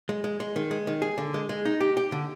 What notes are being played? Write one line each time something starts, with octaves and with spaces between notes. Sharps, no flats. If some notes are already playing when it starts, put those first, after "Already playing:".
G#3
G#3
G#3
D#3
G#3
D#3
G#4
D3
G#3
G#3
D#4
G4
G4
D3